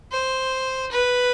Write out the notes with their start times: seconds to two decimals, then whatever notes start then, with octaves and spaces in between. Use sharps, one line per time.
0.11 C5
0.92 B4